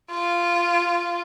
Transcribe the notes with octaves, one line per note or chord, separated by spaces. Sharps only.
F4